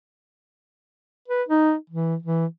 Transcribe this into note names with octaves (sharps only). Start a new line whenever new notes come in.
B4
D#4
E3
E3